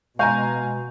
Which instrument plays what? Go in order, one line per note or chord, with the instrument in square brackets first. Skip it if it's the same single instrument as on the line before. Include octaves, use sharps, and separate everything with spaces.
[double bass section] B2 [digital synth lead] G#3 [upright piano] F5 G#5 A#5 [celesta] C#6 G6